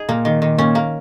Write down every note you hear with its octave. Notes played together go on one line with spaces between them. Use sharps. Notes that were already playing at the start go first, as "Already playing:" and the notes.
Already playing: D#4 G#4
A#2 A#3
D#3
D#3
A#2 C#4
A#3